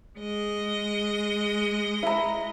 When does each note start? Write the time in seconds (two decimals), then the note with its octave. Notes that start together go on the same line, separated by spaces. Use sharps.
0.20 G#3 D#5
2.03 E4 A#5